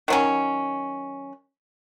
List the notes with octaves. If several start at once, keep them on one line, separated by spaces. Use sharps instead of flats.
D#3 F#3 C#4